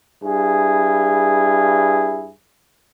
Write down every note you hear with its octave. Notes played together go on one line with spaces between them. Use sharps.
G2 E4 G#4